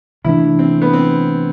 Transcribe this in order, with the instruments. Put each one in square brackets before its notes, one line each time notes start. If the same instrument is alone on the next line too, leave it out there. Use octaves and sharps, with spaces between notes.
[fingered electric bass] C3 E3 A3 D4 [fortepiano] E4
[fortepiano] C4
B3
C4